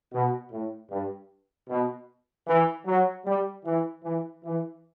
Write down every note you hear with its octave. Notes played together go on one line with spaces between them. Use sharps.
B2
A2
G2
B2
E3
F#3
G3
E3
E3
E3